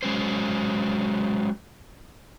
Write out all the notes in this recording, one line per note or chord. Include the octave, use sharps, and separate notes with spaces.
F#3 G#3 C#4 C5